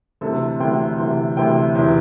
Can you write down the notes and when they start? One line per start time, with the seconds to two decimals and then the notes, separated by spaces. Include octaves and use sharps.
0.21 D2 C3 E3 A4
0.60 D2 C3 E3 G5
0.99 D2 C3 E3
1.37 D2 C3 E3 G5
1.75 E2 C3 E3